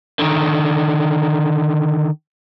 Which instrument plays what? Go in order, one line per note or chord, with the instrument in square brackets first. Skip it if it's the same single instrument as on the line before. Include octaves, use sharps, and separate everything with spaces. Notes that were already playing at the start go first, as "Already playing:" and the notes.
[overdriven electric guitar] D3 D#3